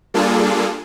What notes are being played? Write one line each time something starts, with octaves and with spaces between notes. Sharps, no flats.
G3 A#3 D4 F4 G#4 A4